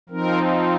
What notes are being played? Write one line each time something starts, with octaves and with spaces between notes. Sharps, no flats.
F3 C4 D#4 A#4